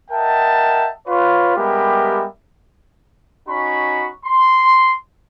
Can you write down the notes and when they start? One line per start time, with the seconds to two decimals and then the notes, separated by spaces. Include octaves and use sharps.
0.10 A#4 D#5 E5 F#5 G5 A5
1.07 F4 B4 C#5
1.56 G3 G#3 B3 G4 A#4 E5
3.48 C#4 D#4 F#4 B5 C#6
4.25 C6